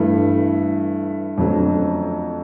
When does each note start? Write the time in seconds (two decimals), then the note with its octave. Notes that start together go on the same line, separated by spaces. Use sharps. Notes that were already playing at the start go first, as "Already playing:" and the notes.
Already playing: G2 E3 A3
1.38 F2 D3 F#3 A3 C#4